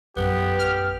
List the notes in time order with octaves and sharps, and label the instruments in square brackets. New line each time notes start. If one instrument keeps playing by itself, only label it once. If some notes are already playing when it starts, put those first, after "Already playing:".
[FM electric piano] A#1 F#2 [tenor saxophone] B3 [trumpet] G4
[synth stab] F6